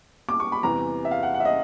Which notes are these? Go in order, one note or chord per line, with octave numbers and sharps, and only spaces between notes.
D6
C#6
B5
E2 C3 E3 G3 A#5
E5
F5
F#5
F#5
E5
D#5